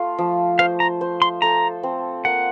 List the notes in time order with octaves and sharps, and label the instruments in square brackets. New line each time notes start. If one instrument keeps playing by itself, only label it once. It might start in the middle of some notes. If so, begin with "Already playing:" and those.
Already playing: [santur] A3 F4
F3
[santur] C5 [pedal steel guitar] F5
[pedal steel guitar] A#5
[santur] C5
[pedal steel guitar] C6
[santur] A4 [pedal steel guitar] A#5
[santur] C4
[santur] A#3 [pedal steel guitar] F#5